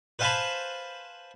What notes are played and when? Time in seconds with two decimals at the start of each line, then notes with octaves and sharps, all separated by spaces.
0.19 B4 C5 F5 G#5 A5 B5